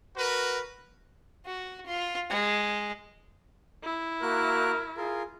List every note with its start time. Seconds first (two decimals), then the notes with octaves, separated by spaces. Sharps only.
0.17 F#4 A#4 B4
1.46 F#4
1.86 F4
2.30 G#3
3.83 E4
4.23 A#3 F#4 A#4 F#6
4.97 F4 G#4 A#4